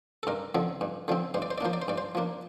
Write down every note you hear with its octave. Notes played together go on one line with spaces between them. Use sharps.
A4
G2 A#4
D3 F3 C4
G2
D3 F3 C4
G2 C5
D5
C5
D5
F3 A#3 D4 C5
D5
C5
G2 D5
C5
F3 A#3 D4